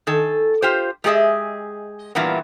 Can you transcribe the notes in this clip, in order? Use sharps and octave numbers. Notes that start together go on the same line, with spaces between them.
D#3 A4 G#5
F4 G4 C5
G#3 G4 G#4 A#4 D#5 E5
G2 A#2 E3 G3 A#3 B3